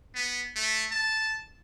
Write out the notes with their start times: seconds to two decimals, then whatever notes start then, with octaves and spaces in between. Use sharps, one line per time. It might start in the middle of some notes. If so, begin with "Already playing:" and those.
0.15 B3
0.56 A3
0.91 A5